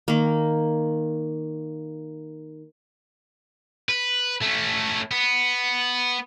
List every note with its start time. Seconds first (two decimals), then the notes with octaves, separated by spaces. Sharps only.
0.08 D#3 A#3
3.89 B4
4.42 A3 C#4
5.11 B3